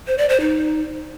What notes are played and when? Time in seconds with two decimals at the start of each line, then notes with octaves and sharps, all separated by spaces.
0.07 C5
0.18 D5
0.29 C5
0.40 D#4